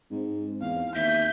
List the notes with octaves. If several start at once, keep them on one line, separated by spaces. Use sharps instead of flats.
G#2 C4
E2 F5
D#2 E5 G6